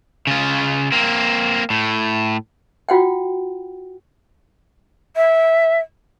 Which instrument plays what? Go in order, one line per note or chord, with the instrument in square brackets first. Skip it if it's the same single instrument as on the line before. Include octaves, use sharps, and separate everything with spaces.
[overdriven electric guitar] C#3 F4
A#3 C4
A2
[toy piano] F4 F#4 F#5 G5
[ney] E5